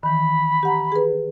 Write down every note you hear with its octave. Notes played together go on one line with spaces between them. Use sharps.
D#3 E3 B5
G4 F#5 A#5
G#4 B4